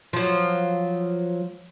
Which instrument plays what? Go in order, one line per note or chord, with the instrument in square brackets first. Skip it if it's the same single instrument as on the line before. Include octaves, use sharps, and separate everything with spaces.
[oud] F3 F#3